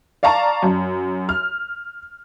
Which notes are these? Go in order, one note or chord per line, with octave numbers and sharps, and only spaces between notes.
D5 F5 A5 A#5 C#6
F#2
F6